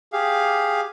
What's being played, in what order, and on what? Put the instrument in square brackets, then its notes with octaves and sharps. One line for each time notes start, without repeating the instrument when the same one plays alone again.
[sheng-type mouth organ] G4 G#4 F5